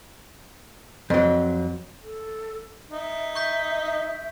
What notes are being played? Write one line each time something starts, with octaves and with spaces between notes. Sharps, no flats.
F2 F#3
A4
D#4 E5
C#6 G6 B6